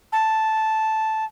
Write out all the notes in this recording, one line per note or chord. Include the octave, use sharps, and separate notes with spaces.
A5